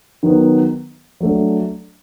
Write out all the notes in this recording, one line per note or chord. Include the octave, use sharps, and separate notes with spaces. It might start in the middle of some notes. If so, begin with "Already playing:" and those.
D#3 F#3 B3
F#3 A3 D4